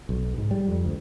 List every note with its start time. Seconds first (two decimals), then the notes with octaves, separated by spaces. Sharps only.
0.09 B1
0.37 G#2
0.51 G3
0.68 F2
0.85 D2